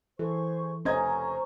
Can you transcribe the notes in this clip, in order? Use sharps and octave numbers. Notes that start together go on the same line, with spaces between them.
E3 G#4 A4 C5 C#6
F1 C#4 C5 D#5 A#5 C#6 G#6